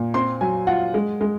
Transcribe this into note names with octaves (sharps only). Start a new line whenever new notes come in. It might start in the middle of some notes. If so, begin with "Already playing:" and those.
Already playing: A#2
C4 C6
F#3 G#5
F4 F#5
G#3
G#3